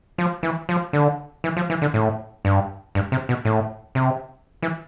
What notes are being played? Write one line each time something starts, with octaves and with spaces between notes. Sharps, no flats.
F3
E3
F3
D3
E3
F3
E3
D3
A2
G2
G2
C3
B2
A2
C3
E3